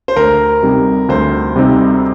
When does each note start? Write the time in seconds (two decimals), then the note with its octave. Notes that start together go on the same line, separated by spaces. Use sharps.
0.08 C5
0.16 D2 A#4
0.63 C3 G3 C4 D#4
1.09 D2 C5
1.56 C3 G3 C4 D#4